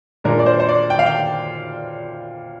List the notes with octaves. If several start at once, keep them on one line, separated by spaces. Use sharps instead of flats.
A#2 G#3 D4 A#4
D5
C5
C5
D5
G5
F5
G5